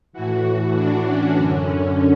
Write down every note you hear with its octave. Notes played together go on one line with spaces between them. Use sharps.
A2 E3 F#4
D4
C#4
F#2 D3
C#4